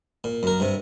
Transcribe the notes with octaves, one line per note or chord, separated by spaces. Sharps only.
A#2
F#2 A#4
G2 C3